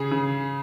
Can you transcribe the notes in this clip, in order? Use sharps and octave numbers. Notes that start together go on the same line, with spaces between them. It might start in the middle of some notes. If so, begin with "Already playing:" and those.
Already playing: C#3 G#4
C#3